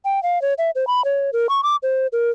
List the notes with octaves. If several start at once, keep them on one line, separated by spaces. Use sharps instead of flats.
G5
F5
C#5
E5
C5
B5
C#5
A#4
C#6
D6
C5
A#4